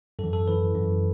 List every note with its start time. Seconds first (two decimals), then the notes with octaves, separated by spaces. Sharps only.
0.19 F#2 E3 A4
0.33 A4
0.47 F#2 E3 B4
0.75 F#2 E3